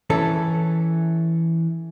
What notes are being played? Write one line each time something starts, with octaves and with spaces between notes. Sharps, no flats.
E3 C#4 A4